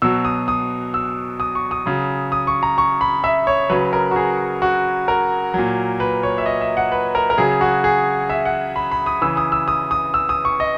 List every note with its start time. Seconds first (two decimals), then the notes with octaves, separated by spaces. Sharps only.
0.02 B2 F#3 E6
0.25 D#6
0.48 D#6
0.94 E6
1.40 D#6
1.55 C#6
1.71 D#6
1.86 C#3 F#3
2.32 D#6
2.47 C#6
2.63 A#5
2.78 C#6
3.01 B5
3.24 E5
3.47 C#5
3.70 C#3 F#3 B4
3.93 A#4
4.11 F#4
4.16 G#4
4.62 F#4
5.08 A#4
5.54 A#2 F#3
6.00 B4
6.23 C#5
6.38 E5
6.46 D#5
6.61 E5
6.77 F#5
6.92 B4
7.15 A#4
7.30 A#4
7.38 C#3 F#3 G#4
7.61 F#4
7.84 G#4
8.30 E5
8.45 F#5
8.76 B5
8.91 B5
9.06 D#6
9.22 C#3 E3 E6
9.37 D#6
9.52 E6
9.68 D#6
9.91 D#6
10.14 E6
10.29 D#6
10.45 C#6
10.60 D#5